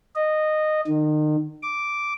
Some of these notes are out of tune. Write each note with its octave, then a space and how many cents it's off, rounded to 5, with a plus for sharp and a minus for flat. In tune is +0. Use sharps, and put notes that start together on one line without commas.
D#5 -15
D#3 -35
D6 -5